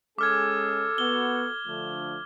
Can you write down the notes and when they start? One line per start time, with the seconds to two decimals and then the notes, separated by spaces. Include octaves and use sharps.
0.19 G#3 C#4 G#4 A4 D6 F6 G#6
0.98 B3 F#4 G7
1.67 D3 F3 A3